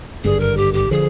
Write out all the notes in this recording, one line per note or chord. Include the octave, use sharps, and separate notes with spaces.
G#1 G2 D3 G#4
A#4
G4
G4
D3 F3 G#4